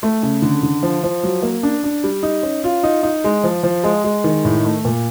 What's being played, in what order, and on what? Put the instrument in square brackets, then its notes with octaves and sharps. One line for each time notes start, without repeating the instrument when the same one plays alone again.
[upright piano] A3
C#3
D3
D3
F3
F3
F#3
A#3
D4
D4
G3
D#4
C#4
F4
D#4
D#4
G#3
F3
F3
G#3
G#3
D#3
A2
A3
A#2